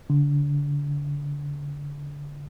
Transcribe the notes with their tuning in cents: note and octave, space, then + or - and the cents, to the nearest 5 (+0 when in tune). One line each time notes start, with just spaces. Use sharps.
D3 -30